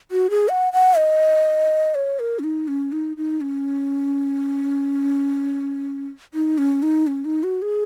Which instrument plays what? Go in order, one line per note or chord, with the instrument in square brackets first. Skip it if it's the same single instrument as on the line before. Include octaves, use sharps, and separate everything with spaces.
[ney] F#4
G#4
F#5
F#5
D#5
C#5
A#4
C#4
D#4
C#4
D#4
D#4
C#4
D#4
C#4
D#4
C#4
D#4
F#4
G#4